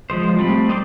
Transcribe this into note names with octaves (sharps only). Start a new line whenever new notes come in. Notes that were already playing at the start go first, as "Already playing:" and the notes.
F3 G#3 C5
G3 A3 C4 B5
D#4 C5 D5 F5 C6